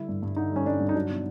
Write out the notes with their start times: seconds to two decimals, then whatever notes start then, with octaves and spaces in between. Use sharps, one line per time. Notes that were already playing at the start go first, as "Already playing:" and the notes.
Already playing: D3 G3 E4
0.09 G2
0.23 G2
0.36 D3 D#4
0.52 G3 C#4
0.66 G2 D4
0.81 G2
0.89 D#4
0.95 F#3 D4
1.09 B2